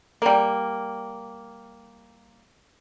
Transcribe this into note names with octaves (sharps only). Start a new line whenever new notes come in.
G3 A#3